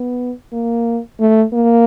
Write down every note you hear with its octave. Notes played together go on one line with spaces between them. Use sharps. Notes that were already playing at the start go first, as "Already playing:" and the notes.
Already playing: B3
A#3
A3
A#3